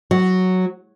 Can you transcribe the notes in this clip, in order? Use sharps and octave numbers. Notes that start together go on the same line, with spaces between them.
F#3